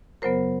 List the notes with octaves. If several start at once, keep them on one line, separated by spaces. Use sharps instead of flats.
F#2 C#3 F#3 B3 A#4 C5